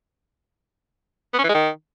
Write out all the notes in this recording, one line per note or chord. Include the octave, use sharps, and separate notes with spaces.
B3
C#4
E3
G#3
D#3